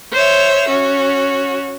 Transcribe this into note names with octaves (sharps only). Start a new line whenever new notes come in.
C5 C#5 E5
C#4 F#4